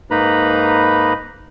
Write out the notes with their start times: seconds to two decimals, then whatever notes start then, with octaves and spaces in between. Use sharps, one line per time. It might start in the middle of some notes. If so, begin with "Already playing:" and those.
0.11 G#2 A#3 D#4 B4 A#5 B5